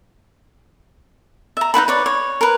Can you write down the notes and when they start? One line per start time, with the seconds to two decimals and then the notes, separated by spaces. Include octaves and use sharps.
1.57 E5 A#5
1.74 D#4 E4 B4 B5
1.88 B4 C#5 D5
2.06 C#5
2.41 A#4 B4